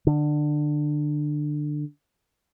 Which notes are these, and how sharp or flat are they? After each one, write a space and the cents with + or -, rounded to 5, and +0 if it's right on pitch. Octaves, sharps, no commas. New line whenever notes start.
D3 +20